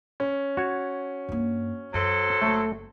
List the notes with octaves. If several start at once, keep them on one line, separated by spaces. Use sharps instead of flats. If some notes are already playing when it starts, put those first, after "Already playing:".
C#4
F#4 C#5
G2 A#3
F#2 F#3 A4 C5
F#1 A3